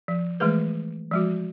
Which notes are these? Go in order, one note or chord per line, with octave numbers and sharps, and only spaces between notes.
F3
E3 G#3 A3 G#4 B4
F3 G#3 F#4